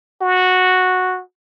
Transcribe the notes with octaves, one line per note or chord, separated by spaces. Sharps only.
F#4